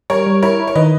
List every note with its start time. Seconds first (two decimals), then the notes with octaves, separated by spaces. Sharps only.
0.10 G3 A#4 C#5
0.26 G3
0.42 E4 A#4 C#5
0.60 E4
0.67 C#5
0.76 D#3 B4 D#5